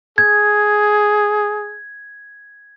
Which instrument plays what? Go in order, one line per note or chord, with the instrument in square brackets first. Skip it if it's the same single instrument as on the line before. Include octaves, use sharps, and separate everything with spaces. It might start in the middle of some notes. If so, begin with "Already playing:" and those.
[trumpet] G#4 [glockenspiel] G#6